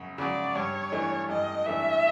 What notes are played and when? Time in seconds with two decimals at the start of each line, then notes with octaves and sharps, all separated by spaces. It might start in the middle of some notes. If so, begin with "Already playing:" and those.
Already playing: F#2 C#3
0.18 C#3 F#3 D5
0.55 G2 C#5
0.92 E3 A3 D4
1.29 G2 D#5
1.66 E3 A3 D4 E5